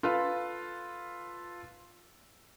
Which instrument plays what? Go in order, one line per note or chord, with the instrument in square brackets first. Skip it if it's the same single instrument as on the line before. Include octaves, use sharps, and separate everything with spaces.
[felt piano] F4 A4 B4 F5